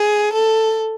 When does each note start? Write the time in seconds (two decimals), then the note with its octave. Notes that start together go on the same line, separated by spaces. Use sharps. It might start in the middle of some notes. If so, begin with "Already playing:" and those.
Already playing: G#4
0.33 A4